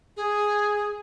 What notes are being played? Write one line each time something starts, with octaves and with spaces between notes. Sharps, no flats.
G#4